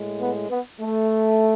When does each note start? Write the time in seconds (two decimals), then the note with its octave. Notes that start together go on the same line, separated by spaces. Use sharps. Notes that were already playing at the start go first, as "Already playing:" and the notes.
Already playing: A2 G#3
0.20 B3
0.50 B3
0.81 A3